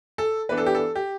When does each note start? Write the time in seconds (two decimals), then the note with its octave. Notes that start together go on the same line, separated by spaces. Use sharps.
0.18 A4
0.49 E3 B3 D4 B4
0.58 A4
0.66 G4
0.75 A4
0.95 G4